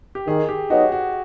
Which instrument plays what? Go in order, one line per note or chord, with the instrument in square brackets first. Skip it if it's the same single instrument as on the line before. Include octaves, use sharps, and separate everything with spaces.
[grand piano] G4
[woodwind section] D#3 [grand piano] G#4
[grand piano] G4
[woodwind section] F#3 B3 D#4 [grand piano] F#4
[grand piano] F#4